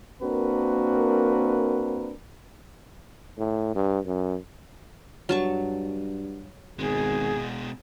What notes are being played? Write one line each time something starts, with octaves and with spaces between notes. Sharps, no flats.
A#3 C4 D4 F#4 A#4 B4
A2
G2
F#2
G2 F#3 A5 C#6
G#1 B2 G#3 G#4